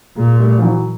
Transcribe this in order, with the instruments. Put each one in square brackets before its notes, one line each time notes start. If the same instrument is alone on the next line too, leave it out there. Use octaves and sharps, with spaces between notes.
[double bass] A#2 [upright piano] G#3 A#3
[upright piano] G3 A3
F3
E3 F#3